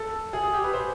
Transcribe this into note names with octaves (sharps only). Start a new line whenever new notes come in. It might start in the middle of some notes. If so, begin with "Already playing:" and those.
Already playing: A4
G#4
G#4
G4
B4
C5